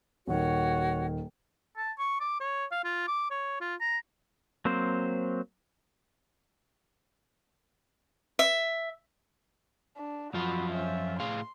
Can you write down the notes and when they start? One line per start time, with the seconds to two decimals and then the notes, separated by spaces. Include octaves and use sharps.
0.27 D#1 D#3 F#4 C#5
1.77 A5
1.99 C#6
2.20 D6
2.40 C#5
2.72 F5
2.84 F4
3.08 D6
3.31 C#5
3.61 F4
3.81 A#5
4.65 F#3 A#3 C4 C5
8.39 E5
9.97 D4
10.34 F#2 F3 F4 F#4 B5
10.72 C#4 E5
11.20 A2 G#4 F5 C6